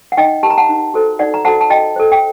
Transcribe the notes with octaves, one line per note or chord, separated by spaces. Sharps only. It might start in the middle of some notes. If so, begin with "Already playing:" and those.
F#5
D#4 D#5 G5
G4 A#4 A5 A#5
F#5 A5
D#4
F#4 A4 C5
D#4 D5 F#5
A#5
F#4 A4 C5 F#5 A5
A5
F#4 D#5 G5
A4 C5
G5